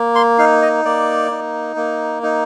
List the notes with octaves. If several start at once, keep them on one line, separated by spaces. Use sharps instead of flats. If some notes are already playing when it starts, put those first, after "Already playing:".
Already playing: A#3
C6
D#4 F5
D#5
A#3 D5
D#4
A#3
D#4